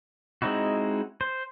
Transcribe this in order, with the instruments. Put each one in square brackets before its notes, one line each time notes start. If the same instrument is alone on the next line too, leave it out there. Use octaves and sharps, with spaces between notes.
[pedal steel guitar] G#3 C4 D#4 E4 F#4
C5